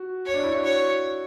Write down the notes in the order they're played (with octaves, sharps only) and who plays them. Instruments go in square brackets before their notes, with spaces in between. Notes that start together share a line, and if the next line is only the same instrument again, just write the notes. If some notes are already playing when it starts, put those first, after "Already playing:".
Already playing: [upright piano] F#4
[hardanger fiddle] C#5
[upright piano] D4
E4
F#4
[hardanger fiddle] C#5